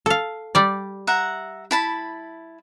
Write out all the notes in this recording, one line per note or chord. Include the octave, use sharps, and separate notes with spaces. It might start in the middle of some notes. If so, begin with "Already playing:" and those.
A4 F5
G3 D5
E5 F#5 A#5
E4 A5 B5